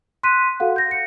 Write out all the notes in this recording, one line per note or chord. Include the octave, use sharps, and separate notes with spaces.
C6 F#6 B6 D#7
F#4 A4 F5 F#5
G6 A#6
C#7